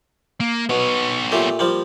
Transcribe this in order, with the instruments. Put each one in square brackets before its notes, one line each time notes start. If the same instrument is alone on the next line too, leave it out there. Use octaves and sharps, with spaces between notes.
[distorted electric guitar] A#3
[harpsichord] B2 [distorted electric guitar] B3 C#5
[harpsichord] A#2 A3 G4
F3 G3 A#3